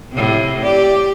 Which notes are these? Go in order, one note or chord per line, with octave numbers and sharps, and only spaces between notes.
A2 C3
G4 D5